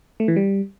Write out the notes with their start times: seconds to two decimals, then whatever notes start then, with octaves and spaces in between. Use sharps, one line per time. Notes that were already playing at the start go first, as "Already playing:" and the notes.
0.20 A3
0.28 E3
0.36 G3